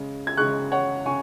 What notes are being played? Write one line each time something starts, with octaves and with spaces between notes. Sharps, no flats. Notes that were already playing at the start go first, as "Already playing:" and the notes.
Already playing: C#3 G#3
G#6
C#3 G#3 C#6 F#6
C#5 F#5
C#3 G#5 C#6